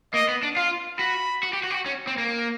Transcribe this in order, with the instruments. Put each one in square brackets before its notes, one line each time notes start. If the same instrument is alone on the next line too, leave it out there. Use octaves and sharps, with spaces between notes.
[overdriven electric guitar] A#3 [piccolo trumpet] D#5
[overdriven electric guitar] B3
D4
[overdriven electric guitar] F4 [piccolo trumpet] F5
[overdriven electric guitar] F#4 [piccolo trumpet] B5
[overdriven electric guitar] F#4
G4
F#4
G4
F#4
C#4
C4
A#3